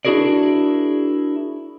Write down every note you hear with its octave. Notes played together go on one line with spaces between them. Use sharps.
D4 E4 F#4 G#4 A#4 D5